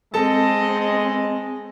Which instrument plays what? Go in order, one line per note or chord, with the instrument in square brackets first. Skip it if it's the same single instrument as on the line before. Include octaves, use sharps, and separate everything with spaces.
[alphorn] G#3 [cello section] C4 [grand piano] A4 A5 [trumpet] D#5